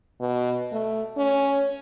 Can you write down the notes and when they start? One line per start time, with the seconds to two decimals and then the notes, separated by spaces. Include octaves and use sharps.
0.21 B2
0.72 A3
1.17 C#4